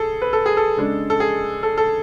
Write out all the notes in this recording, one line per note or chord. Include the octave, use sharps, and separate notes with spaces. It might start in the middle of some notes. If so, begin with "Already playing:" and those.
Already playing: G#4 A4
B4
A4
G#4
A4
C#3 G#3 D4
A4
G#4
A4
A4